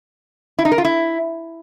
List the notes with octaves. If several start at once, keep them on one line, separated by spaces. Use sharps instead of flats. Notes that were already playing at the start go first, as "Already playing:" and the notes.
E4
D#4
A#4
F4
E4